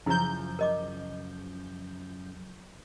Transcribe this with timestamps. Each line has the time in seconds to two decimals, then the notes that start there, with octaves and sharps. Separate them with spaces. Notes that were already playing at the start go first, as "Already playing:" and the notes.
0.06 F#2 C#3 F3 E4 A#5 G6
0.59 A#4 D#5 D6